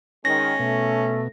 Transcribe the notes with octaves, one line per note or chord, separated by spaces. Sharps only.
D#3 G#3 C#4 A#6
B2 A3